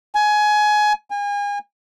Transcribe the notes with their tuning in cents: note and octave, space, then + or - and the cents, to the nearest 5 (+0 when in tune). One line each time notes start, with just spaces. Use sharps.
G#5 +20
G#5 -35